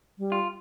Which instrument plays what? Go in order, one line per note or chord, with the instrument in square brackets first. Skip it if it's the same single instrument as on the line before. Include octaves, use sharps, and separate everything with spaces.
[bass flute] G3
[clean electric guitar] F4